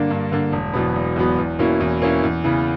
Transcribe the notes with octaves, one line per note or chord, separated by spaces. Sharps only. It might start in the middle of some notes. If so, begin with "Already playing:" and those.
Already playing: G2 D3 A#3 D4
G2
D3 A#3 D4
E1
E2 B2 F#3 B3
E1
E2 B2 F#3 B3
E2
B2 A#3 C#4 E4
E2
B2 A#3 C#4 E4
E2
C#3 E3 B3